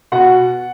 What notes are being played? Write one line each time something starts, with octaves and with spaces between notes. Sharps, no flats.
B2 F#5